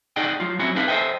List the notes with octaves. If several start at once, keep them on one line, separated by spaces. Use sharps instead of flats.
D#4 G#4 D5 D#5 F#5 G5
F#3 F4
F#3 C4 C#4 E4 F#4
C4 D#4 E4 G#4 B4 F5
A4 C5 D#5 E5 G5